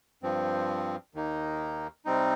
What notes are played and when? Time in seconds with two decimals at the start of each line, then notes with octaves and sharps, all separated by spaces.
0.23 G2 F3 C4
1.15 D#2 D#3 A#3 D#4
2.05 C3 G3 C4 D#4